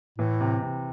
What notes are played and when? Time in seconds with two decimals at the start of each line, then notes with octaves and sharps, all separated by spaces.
0.18 A2 E3
0.40 C3
0.62 C3